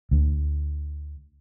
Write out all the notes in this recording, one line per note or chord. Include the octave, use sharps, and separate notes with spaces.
D2